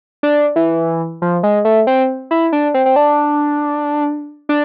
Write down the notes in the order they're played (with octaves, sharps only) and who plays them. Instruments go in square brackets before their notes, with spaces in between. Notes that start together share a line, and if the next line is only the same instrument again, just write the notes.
[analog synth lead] D4
E3
F3
G#3
A3
C4
E4
D4
C4
C4
D4
D4